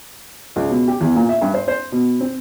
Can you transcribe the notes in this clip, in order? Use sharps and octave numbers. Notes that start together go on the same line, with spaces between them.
C#2
B2
G4
E2
A#2
E5
G2
C5
C5
B2
C4